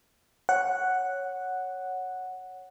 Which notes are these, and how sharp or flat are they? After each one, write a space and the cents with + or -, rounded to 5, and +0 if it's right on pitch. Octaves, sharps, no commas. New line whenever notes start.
C#5 +0 F#5 +0